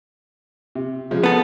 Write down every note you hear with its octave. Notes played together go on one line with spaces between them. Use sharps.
C3
C#3 F3 G#3
B3 A4